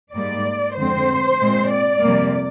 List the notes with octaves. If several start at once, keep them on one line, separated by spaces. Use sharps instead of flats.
G#2 G3 A#3 D5
F2 D3 G#3 C4 C5
A#2 G#3 C4
D5
F2 C3 G3 A#3